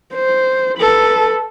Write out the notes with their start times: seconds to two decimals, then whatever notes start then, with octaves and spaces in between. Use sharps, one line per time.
0.14 C5
0.78 A4 B4